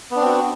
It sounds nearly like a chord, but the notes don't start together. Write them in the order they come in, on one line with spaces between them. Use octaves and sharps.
B3 D4 C4 F#4